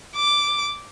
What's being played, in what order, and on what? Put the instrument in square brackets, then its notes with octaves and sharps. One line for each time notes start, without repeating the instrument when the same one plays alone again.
[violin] D6